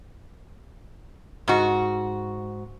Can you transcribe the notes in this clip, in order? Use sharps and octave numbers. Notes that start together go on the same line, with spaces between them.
G#2 F#4